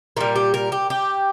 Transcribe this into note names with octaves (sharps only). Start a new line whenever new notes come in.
A#2 G3 A#4
G4
A#4
G4
G4